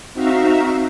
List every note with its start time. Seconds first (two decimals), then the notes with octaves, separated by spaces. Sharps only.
0.14 C4 D#4 F#4 E5 F5 A#5